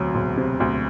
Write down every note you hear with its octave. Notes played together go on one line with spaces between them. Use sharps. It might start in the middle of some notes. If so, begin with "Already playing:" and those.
Already playing: E1 D2 C3 F#3
E1
C3
D2